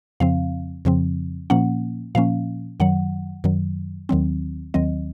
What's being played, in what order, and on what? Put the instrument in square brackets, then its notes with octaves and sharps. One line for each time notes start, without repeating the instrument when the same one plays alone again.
[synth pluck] F2 C#3 F3 C4 F5
F2 C#3 F3 C4
A#2 F3 A#3 C#4 F#5
A#2 F3 A#3 C#4 F5
F#2 D#3 F#3 F#5
F#2 D#3 F#3
D#2 D#3 F#3 C4
D#2 D#3 F#3 C4 D#5